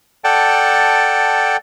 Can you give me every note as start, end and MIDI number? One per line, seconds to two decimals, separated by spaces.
0.24 1.57 69
0.24 1.57 74
0.24 1.57 78
0.24 1.57 79
0.24 1.57 81